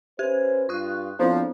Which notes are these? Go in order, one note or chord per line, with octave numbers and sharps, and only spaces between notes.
C#4 G4 B4 C5 G#6
G2 F4 C#6 D#6 F#6
F3 B3 C4 D4 E4